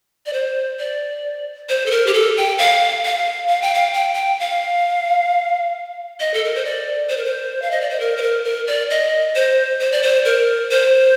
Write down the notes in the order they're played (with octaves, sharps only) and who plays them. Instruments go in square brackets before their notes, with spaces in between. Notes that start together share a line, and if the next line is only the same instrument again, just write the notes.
[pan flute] D5
C5
D5
C5
A4
A#4
G4
A4
G5
F5
F5
F5
G5
F5
G5
G5
F5
D#5
A4
A#4
C5
D5
C5
A#4
C5
F5
D#5
D5
C5
A#4
C5
A#4
A#4
D5
D#5
C5
C5
D5
C5
A#4
C5